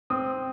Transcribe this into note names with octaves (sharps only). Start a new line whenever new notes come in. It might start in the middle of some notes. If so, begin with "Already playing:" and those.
C4 D#6